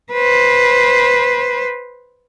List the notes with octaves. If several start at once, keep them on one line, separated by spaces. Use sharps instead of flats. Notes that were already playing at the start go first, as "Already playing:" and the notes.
B4 C5